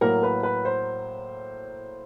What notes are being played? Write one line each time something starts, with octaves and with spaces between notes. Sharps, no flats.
A2 F#3 A#3 A#4
B4
B4
C5